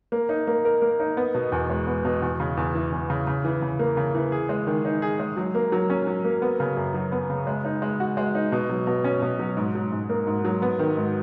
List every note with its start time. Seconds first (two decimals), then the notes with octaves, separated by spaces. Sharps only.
0.12 A#3
0.29 D#4
0.47 A#3
0.65 A#4
0.82 A#3
1.00 D#4
1.17 B3
1.34 B2
1.52 E2
1.70 G#3
1.87 B3
2.05 B2
2.22 E2
2.40 C#3
2.57 E2
2.75 E3
2.92 E2
3.10 C#3
3.27 C#3
3.45 E3
3.62 C#3
3.79 A#3
3.97 C#3
4.15 E3
4.32 G#4
4.49 G#3
4.67 D#3
4.85 D#4
5.02 G#4
5.20 G#3
5.37 F#3
5.55 A#3
5.72 F#3
5.90 C#4
6.07 F#3
6.25 A#3
6.42 B3
6.60 C#3
6.77 F#2
6.94 F#3
7.12 B3
7.30 C#3
7.47 G#3
7.65 D#4
7.82 G#3
8.00 F#4
8.17 G#3
8.35 D#4
8.52 B2
8.69 F#3
8.87 B2
9.04 C#4
9.22 B2
9.39 F#3
9.57 G#2
9.75 F#3
9.92 G#2
10.10 A#3
10.27 G#2
10.45 F#3
10.62 B3
10.79 D#3
10.97 G#2